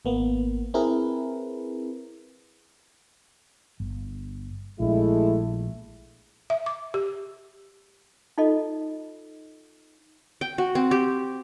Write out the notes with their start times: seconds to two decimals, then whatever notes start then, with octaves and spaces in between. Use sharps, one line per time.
0.05 G#1 A#3 B3
0.74 C4 E4 G#4 A#4 B4
3.80 G1
4.80 A#1 G#3 A3 E4
6.50 E5
6.66 D6
6.94 G4
8.38 D#4 F4 A4 D#5
10.41 G5
10.58 F#4
10.75 C4
10.91 G4